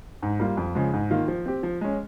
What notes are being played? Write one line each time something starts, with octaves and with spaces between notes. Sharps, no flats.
G#2
G3 A#3 F4
F2
C#3 F3 G#3
G#2
D#3 A#3 F4
F3
C4 G4
F3
G#3 C#4